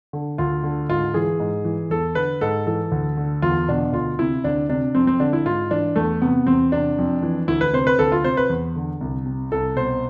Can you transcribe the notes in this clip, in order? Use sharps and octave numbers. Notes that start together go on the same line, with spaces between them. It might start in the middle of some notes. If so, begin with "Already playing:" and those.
D3
D2 F4
D3
G#2 F4
E3 G#4
G#2
E3
E2 A4
D3 B4
G#2 A4
E3 A4
D2
D3
E2 F4
B2 D4
D2 F4
C3 E4
D2 D4
C3 D4
F2 C4
C4
D3 D4
E4
G#2 F4
E3 D4
E2 A3
C3 B3
E2 C4
C3 D4
F2
E3
D2 E4
B4
C3 C5
B4
D2 A4
F4
C3 C5
B4
E2
D3
C2
C3
C2 A4
B2 C5